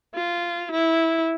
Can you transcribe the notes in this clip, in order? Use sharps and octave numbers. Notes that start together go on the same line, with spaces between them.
F4
E4